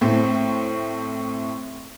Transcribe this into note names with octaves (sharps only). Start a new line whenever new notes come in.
A2 A3 C4